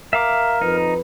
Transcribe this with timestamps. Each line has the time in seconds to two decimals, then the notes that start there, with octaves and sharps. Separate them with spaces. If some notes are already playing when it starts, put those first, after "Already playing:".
0.13 A#4 E5 F5 D6
0.62 F2 F3 D#4 B4